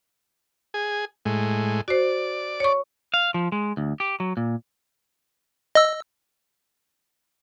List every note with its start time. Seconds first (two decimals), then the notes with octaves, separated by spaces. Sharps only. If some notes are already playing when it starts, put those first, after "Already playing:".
0.74 G#4
1.25 A2 G#3
1.88 F#4 C5 D5
2.60 C#5 C#6
3.14 F5
3.34 F3
3.52 G#3
3.77 D2
4.00 G4
4.20 F#3
4.37 A#2
5.75 D#5 E6